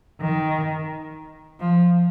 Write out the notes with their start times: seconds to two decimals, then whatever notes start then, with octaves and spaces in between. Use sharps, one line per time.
0.21 D#3
1.60 F3